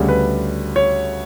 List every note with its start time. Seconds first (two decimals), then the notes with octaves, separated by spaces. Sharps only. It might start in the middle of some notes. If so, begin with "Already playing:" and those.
Already playing: D2 C#3 G3
0.09 B4
0.76 C#5